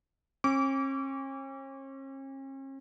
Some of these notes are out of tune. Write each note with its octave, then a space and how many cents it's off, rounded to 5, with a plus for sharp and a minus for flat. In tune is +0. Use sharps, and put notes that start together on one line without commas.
C#4 -45 D6 -35